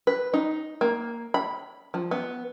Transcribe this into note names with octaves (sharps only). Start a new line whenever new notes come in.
B4
D#4
A#3
B5
F3
B3